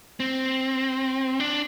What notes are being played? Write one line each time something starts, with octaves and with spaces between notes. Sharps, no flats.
C4
D4